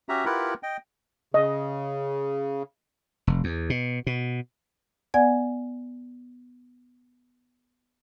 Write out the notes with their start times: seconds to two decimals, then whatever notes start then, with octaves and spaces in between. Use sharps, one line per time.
0.09 C#4 F#4 G4 E5 A#5
0.25 E4 F4 G4 A#4 B4 F#5
0.63 D#5 G5
1.34 C#3 D#5
3.27 F1
3.44 E2
3.70 B2
4.07 B2
5.14 B3 D5 F#5 G#5 G#6